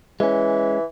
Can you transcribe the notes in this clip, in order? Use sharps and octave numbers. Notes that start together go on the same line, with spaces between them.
E3 G#3 C#4